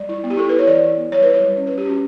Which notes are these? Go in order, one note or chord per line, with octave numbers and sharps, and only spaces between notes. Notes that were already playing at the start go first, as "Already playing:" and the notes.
Already playing: G3 D5
E4
B3
G4
E4 A4
E4 B4
C#5
E3 D5
E4
B3
G3 C#5
E4 B4
C#5
G3
C#4 C#5
G3 B4
G4
C#4 F#4